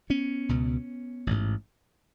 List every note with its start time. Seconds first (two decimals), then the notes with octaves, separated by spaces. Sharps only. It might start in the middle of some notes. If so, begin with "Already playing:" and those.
0.10 B3 C#4
0.49 C#2 B2
1.27 A1 G#2